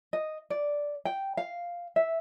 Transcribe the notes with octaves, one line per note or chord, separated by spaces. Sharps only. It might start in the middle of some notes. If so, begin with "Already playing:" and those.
D#5
D5
G5
F5
E5